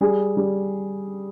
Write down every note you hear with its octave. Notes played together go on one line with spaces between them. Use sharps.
G3 G#4
G3